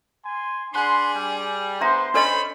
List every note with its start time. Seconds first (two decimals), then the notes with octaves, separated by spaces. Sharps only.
0.24 G#5 C6
0.74 D4 G#4 D5 F#5 G#5 B5 C6
1.14 G3
1.81 B3 D4 C5 E5 A#5 C6
2.14 C#4 D4 A4 C5 D#5 B5